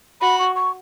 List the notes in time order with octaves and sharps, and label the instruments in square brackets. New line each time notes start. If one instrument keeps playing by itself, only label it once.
[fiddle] F#4 [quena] B5
[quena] C#6
C#6